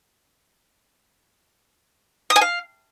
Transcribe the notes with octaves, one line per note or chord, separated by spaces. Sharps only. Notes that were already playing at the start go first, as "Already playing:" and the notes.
D#6
G#5
F5